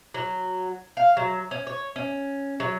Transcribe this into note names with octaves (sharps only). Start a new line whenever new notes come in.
F#3
F5
F#3
C#4
C#5
C#4
F#3